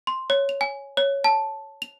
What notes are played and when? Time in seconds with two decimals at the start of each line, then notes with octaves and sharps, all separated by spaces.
0.07 C6
0.30 C#5
0.49 F7
0.61 G#5
0.97 C#5
1.24 A5
1.82 F7